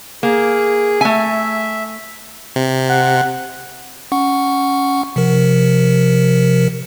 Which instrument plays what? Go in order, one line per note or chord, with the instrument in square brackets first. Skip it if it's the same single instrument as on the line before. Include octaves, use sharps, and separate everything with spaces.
[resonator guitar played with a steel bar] A#3 [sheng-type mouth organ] G#4
[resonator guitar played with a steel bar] A3 G#5 [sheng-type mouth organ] E5
[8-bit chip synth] C3
[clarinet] F#5
[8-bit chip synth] C#4 F#5 C#6
C3 F3 A#4